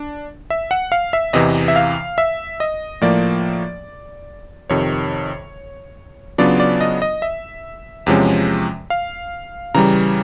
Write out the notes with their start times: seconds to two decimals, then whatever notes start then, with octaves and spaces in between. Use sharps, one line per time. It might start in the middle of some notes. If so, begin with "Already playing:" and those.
Already playing: D4
0.50 E5
0.71 F#5
0.92 F5
1.13 E5
1.33 E2 C3 E3 D#5
1.68 E5
1.76 F5
2.18 E5
2.60 D#5
3.01 A2 F3 A#3 D5
4.70 F2 C3 D#3 C#5
6.38 C#3 F#3 B3 D4 F4 D5
6.60 D5
6.81 D#5
7.02 D#5
7.22 E5
8.06 E2 C3 F3 G#3 C#4
8.90 F5
9.74 C#3 E3 G3 A#5